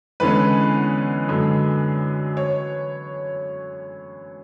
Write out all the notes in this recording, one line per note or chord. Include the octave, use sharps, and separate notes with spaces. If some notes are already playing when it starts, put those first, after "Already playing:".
E2 D3 G#3 C#4 B4
F#2 D3 G#3
C#5